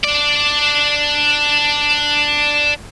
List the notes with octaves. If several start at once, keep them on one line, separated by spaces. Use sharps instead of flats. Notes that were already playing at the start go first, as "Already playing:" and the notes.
D4 D5